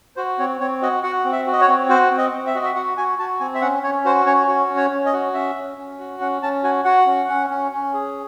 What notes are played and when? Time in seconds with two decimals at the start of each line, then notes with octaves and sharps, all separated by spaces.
0.16 F#4 C5
0.39 C4 C#5
0.60 C4 C#5
0.82 F#4 D#5
1.03 F#4 F#5
1.25 C4
1.32 E5
1.47 F#4
1.53 D#5
1.61 C#5
1.68 C4
1.89 F#4 C5
2.11 C4
2.18 D#5
2.32 C4
2.47 E5
2.55 F#4 D#5
2.65 E5
2.75 F#4 F#5
2.97 F#4 G#5
3.19 F#4 A5
3.40 C4 G#5
3.55 E5
3.61 C#4 F#5
3.83 C#4 C#5
4.05 F#4 C5
4.26 C#4 C#5
4.48 F#4
4.70 C#4
4.77 C#5
4.91 C#4
5.06 D#5
5.13 F#4
5.34 C#4 E5
5.56 C#4
5.78 C#4
5.99 F#4
6.20 C#4 F#5
6.42 C#4 A5
6.64 F#4 G#5
6.85 F#4 F#5
7.06 C#4
7.29 C#4
7.50 C#4
7.72 C#4
7.94 G#4